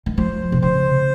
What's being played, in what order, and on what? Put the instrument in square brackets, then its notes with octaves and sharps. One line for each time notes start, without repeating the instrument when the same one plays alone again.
[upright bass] D#3
[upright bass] F3 [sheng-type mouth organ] C5
[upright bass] C3
[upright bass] C#3 [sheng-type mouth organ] C5